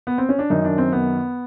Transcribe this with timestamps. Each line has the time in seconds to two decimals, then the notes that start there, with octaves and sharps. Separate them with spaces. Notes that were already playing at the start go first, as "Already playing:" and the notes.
0.07 B3
0.18 C4
0.29 C#4
0.39 D4
0.50 F#2 D#3 D#4
0.65 D4
0.78 C4
0.92 B3